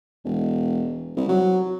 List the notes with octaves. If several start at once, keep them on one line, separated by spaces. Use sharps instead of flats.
E1
C2
F#3